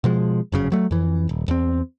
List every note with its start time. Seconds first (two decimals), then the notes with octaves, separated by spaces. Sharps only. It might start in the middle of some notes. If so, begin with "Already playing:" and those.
0.04 B2 F3 G#3
0.52 F1 F#2 C#3
0.72 F#3 A3
0.91 F2 E3
1.29 D#1
1.48 E2 C4